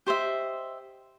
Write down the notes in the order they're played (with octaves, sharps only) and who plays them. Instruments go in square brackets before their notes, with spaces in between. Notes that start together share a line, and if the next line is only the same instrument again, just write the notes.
[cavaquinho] G4 C5 D#5 E5